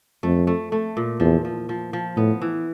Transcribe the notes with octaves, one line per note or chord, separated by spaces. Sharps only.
F2 A3
A3
A3
A#2
E2 F3
F3
F3
F3
A2 B3
E3